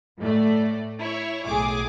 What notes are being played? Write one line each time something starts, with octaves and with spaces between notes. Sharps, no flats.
A2 A3 D5
E4 C#5
B1 A2 G#4 D6